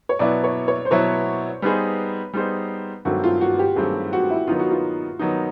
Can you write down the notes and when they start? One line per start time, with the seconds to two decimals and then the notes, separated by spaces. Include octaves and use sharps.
0.09 C#5
0.19 B2 F#3 B3 E4 D5
0.44 C#5
0.68 C#5
0.85 C5
0.91 B2 F#3 B3 E4 C#5
1.62 G3 B3 D#4 G#4 B4 C5
2.34 G3 B3 D#4 G#4 C5
3.05 G2 D#3 F#3 A3 C4 F#4
3.24 F4
3.41 F#4
3.59 G4
3.76 G2 D#3 F#3 A3 C4 G#4
4.13 F#4
4.30 E4
4.47 D#3 F#3 B3 D#4 F4
4.59 F#4
4.71 F4
5.19 D#3 F#3 B3 D#4